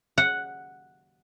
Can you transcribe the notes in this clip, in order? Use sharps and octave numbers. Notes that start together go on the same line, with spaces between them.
F#5